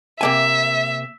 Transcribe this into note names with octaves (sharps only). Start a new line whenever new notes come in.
C3 A#3 E5 G#5